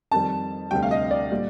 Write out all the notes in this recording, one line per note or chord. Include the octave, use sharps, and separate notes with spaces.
F2 D#3 G3 A5
D2 C3 G3 G5
F5
D#5
D5
A#2 G3